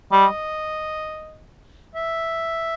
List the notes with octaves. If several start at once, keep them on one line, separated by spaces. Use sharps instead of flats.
G3 D#5
E5